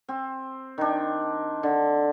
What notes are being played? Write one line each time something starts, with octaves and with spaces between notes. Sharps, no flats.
C4
D#3 D4
D3